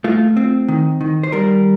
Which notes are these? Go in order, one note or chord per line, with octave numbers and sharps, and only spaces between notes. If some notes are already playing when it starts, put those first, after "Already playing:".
A3 F4
C4
D#3
D#3
C5
G3 A#4